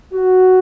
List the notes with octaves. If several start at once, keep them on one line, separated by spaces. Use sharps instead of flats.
F#4